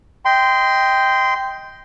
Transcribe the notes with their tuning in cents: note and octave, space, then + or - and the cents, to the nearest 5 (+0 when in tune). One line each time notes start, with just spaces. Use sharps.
D#5 +15 G5 +0 C6 -20